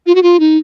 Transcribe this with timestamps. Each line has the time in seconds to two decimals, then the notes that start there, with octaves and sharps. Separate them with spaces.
0.07 F4
0.15 F#4
0.23 F4
0.40 D#4